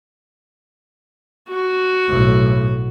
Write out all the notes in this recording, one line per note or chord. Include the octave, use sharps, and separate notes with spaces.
F#4
B1 A2